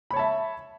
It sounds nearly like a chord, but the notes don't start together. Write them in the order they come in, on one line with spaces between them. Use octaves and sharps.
B5 C#5 A5 E5